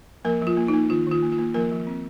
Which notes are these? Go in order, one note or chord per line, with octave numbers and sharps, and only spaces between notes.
F3 A#3 A#4
F3
F4
A#3
D#4
A#3
D#3 F4
D#3
F4
A#3
F4
A#3
F3 A#3 A#4
F3
C4